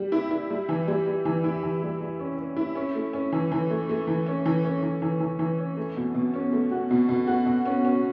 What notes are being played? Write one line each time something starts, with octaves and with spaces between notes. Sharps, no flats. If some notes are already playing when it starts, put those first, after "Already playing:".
Already playing: G3
E4
E4
G3
E3
G3
G3
E3
E4
E3
G3
G3
C#4
C#4
E4
C#4
A3
C#4
E3
E3
A3
A3
E3
C#4
E3
C#4
E3
E3
E3
E3
C#4
A3
B2
B2
C#4
A3
F#4
B2
B2
F#4
B2
C#4
C#4